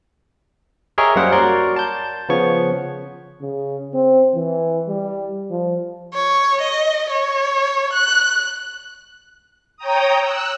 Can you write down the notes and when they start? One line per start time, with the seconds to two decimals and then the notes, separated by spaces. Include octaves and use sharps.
0.98 G4 G#4 A#4 C#5 D#5 E5
1.16 F#2 G3 A#3 C#4 C5 F#5
1.32 F#4 A#4 C#5 D5 C6
1.76 A5 G6
2.29 C#3 F3 B3 C#5 C#6
3.41 C#3
3.94 C4
4.35 E3
4.88 G3
5.50 F3
6.14 C#5
6.62 D#5
7.10 C#5
7.93 F#6
9.77 C#5 G5 A#5 D#6
10.19 E6 F#6